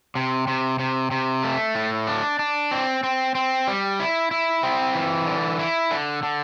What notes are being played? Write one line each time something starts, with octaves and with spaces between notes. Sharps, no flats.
C3
C3
C3
C3
A3
A2
D4
D4
C4
C4
C4
G3
E4
E4
C4
E3
D3
E4
D3
D3